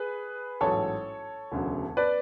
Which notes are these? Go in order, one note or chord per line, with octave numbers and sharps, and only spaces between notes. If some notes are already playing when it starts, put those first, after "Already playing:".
Already playing: G#4 B4
A1 G#2 F#3 A4 C#5
E1 D2 C#3 F#3
B4 D5